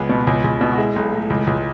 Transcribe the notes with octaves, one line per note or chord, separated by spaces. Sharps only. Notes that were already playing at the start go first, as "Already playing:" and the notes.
Already playing: C#2 B3 G#4
B2
C#2
C#2
B2
F#4
G#3 E4
B1
A2
C#2
C#2